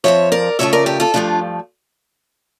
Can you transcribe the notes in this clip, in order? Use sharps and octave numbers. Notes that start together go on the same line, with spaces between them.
F2 C#3 F3 C#5 E5
A#4 D5
C#3 F3 A3 C#5 E5
A#4 D5
G4 A#4
F4 A4
G2 F3 A3 D4 F4